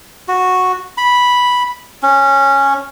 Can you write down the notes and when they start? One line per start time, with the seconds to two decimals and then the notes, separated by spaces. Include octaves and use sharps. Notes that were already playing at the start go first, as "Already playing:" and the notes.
0.28 F#4
0.98 B5
2.03 C#4